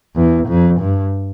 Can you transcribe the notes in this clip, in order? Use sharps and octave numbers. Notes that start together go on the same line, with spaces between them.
E2
F2
G2